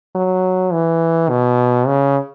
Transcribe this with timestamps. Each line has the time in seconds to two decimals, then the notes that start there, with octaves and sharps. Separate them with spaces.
0.15 F#3
0.73 E3
1.29 B2
1.87 C#3